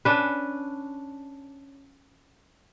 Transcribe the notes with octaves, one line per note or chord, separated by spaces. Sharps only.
C#4 D4 B4